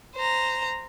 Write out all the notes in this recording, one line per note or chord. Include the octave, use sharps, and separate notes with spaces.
C5 A#5